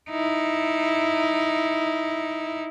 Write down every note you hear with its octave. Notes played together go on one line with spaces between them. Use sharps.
D#4 E4